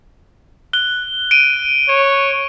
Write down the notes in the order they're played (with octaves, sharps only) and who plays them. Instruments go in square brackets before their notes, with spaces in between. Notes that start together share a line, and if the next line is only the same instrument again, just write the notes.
[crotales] F#6 G7
D7 D#7
[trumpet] C#5